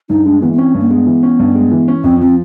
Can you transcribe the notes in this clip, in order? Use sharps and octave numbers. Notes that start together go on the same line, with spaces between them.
G2 D#4
G#3 D4
E3 B3
B3
C4 C#4
G2
A#3
G#3 B3
E3
C#4
G2
G#3
E3
C#4
F2 C4
F3 C4